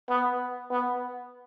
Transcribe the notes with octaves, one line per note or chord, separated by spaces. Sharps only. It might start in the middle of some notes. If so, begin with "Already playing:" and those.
B3
B3